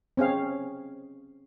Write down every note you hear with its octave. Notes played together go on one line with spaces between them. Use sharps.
C4 C#4 G#4 F5